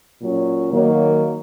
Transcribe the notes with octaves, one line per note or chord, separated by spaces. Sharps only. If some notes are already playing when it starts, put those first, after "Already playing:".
A#2 F#3 C#4
D#3 F#3 A#3